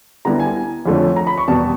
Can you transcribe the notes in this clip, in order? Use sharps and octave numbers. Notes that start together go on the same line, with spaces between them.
D3 G3 B3 E4 A#5
G#5
F2 D3 F3 A3 C#4
A#5
B5
C#6
E2 B2 G3 B3 A5